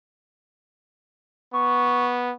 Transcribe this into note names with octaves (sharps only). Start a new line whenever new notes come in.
B3 C#6